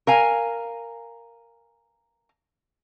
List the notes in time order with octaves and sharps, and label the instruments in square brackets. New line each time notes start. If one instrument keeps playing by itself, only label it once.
[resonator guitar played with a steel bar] A#4 F5 G#5